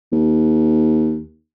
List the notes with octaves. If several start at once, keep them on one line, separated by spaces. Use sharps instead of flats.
D#2